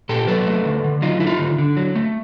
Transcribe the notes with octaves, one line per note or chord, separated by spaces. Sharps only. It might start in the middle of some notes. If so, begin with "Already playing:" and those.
A#2 G4 A4
F#3 A4 B4
A3
D3
D3
F#3 D#4 F4
A3 E4
D#4 F4
D3
D3
F#3
A3